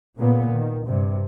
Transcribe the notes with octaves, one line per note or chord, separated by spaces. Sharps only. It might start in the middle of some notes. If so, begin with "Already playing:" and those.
A#2 C#3 A#3 B3
D#3
G2 C3